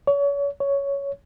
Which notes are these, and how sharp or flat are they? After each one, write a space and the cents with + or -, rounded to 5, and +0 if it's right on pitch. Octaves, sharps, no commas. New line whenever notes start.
C#5 +35
C#5 +10